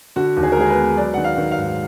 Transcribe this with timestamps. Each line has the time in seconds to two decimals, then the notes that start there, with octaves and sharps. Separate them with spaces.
0.16 D3 F#4
0.37 D#2
0.43 G#4
0.52 A#4
0.57 G#3 G#4
0.70 B4
0.77 B3
0.97 F#3 D5
1.14 D#3 F#5
1.24 F5
1.38 D#3
1.51 F5
1.58 G#2